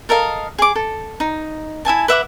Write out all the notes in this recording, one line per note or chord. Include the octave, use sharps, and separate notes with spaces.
A4 A#4 D#5 F5
G#4 D6
A4
D#4
E4 E5 G#5 A5
B4 E5 F#5 D6